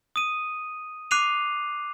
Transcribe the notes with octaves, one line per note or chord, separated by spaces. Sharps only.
D#6 D#7
D6 F#6 C7 D#7 F7